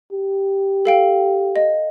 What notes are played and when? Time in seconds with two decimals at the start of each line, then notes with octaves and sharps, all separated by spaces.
0.13 G4
0.85 A4 F5 G5
1.56 D#5